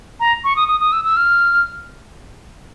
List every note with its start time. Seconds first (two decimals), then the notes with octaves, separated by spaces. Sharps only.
0.20 A#5
0.44 C#6
0.56 D#6
0.68 D#6
0.81 D#6
0.92 E6
1.05 E6
1.17 F6